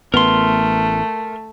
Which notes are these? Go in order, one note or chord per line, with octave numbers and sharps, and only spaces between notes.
A1 A3 B3 A#4 C6